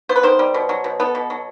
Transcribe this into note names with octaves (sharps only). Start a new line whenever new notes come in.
B3 C5
B4
D#3 C5
G3
B2
F#3
B2
B3 A4
B2
F#3